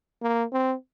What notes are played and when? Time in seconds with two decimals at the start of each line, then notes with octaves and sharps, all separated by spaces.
0.22 A#3
0.53 C4